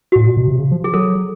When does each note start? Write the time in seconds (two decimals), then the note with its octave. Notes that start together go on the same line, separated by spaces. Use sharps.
0.12 A2 F#4
0.27 A#2
0.37 B2
0.48 C3
0.59 C#3
0.71 F3
0.84 G#4
0.94 F#3 A4